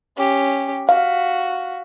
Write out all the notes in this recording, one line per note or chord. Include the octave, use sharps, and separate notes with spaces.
C#4 G4
F#4 F5